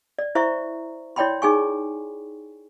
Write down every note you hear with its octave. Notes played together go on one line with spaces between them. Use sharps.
D5
E4 C5 E5 A#5 C#6
E4 C#5 D5 G5 B5 C6
D#4 G#4 G#5 C#6